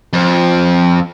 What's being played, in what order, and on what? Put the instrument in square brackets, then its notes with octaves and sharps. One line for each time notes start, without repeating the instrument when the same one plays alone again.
[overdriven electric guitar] F2